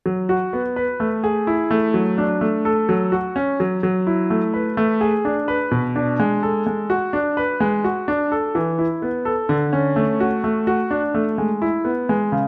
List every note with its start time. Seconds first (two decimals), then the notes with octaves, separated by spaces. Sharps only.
0.06 F#3
0.29 F#4
0.53 B3
0.76 B4
1.00 A3
1.24 G#4
1.47 E4
1.71 A3
1.94 F#3
2.18 D4
2.41 A3
2.65 A4
2.89 F#3
3.12 F#4
3.36 C#4
3.60 F#3
3.83 F#3
4.07 E4
4.30 A3
4.54 B4
4.77 A3
5.01 G#4
5.25 D4
5.48 B4
5.71 B2
5.96 D4
6.20 G#3
6.43 A4
6.66 G#3
6.90 F#4
7.13 D4
7.37 B4
7.60 G#3
7.84 F#4
8.08 D4
8.32 A4
8.55 E3
8.79 E4
9.02 B3
9.25 A4
9.49 D3
9.73 C#4
9.96 A3
10.20 F#4
10.44 A3
10.67 F#4
10.91 D4
11.14 A3
11.38 G#3
11.62 E4
11.85 B3
12.09 G#3
12.32 C#3